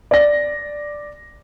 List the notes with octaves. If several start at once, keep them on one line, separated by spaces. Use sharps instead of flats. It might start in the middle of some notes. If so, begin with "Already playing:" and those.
D5 A#6